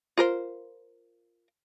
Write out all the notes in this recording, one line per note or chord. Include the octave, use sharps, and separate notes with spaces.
F4 A#4 C5